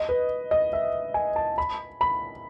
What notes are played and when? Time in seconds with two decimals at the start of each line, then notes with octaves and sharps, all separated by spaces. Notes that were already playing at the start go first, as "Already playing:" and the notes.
Already playing: D#5
0.09 B4
0.51 D#5
0.73 E5
1.14 G#5
1.36 A5
1.58 B5
2.01 B5